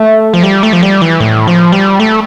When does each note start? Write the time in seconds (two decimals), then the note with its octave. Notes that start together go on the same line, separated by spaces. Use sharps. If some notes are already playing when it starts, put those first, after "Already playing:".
Already playing: A3
0.34 F3
0.43 G3
0.63 A3
0.73 F3
0.83 G3
1.02 E3
1.20 A2
1.47 F3
1.72 G3
2.00 A3